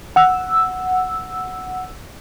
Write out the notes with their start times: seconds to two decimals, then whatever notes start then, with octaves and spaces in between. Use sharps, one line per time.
0.16 F#5 E6